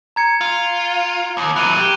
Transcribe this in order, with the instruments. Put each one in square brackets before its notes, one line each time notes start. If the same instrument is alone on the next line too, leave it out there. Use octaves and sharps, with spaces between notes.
[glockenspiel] A#5 G#6 C#7
[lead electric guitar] F4
D#2
[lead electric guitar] E3 F#3 [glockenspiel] F#6 D#7
[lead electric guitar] G4